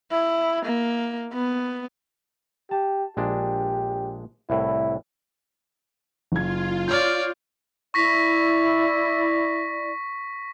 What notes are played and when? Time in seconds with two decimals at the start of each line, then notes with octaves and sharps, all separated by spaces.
0.11 E4
0.66 A#3
1.34 B3
2.71 G4 A5
3.17 A#1 G#3 D4 G4
4.50 C2 A2 E4
6.32 F#1 F4 G#6
6.88 C#5 D5 F6 G6
7.94 E4 D5 C#6 A#6 B6